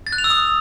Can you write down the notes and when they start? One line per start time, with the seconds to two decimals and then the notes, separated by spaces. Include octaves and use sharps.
0.07 A6
0.12 F#6
0.18 F7
0.24 E6
0.30 D#6